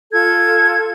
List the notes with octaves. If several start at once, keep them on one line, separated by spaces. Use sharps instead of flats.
F4 A4 G#6